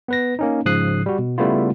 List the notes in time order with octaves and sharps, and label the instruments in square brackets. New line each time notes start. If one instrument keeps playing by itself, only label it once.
[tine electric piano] B3 B4 A#6
A#3 C#4 D#4
G#2 C#3 F3 D#6 F#6 C7
G3 F#4
B2
C#3 G3 A3 B3 E4 F4